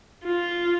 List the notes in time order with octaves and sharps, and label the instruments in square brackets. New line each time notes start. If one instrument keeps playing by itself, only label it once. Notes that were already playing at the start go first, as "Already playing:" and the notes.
[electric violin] F4